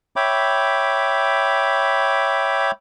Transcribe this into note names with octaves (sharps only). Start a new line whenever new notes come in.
C#5 E5 G5 B5 D6